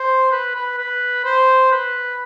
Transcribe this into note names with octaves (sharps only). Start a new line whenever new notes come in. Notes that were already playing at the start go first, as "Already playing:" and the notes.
Already playing: C5
B4
B4
B4
C5
B4